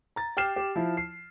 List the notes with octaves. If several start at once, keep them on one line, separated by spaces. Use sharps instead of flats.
A#5 A6
G4 G5 F6 C7 E7
G4
F3 E4
C7